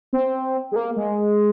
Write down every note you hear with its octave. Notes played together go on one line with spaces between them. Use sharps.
C4
G#3
A#3
G#3